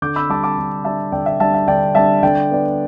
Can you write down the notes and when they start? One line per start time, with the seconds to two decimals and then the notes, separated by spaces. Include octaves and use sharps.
0.02 D3 D6 G6
0.16 B5 E6
0.29 G3 D4 A5 D6
0.44 A5 D6
0.58 D3
0.84 G3 D4 E5 A5
1.12 D3 D5 G5
1.26 E5
1.40 G3 D4 E5 A5
1.54 E5
1.68 D3 D5 G5
1.95 G3 D4 E5 A5
2.23 D3 D5 G5
2.51 B3 D4